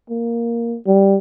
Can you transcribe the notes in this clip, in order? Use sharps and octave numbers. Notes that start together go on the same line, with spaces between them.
A#3
G3